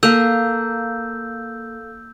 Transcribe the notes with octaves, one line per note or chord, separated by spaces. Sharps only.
A#3 A4 F5 E6 G6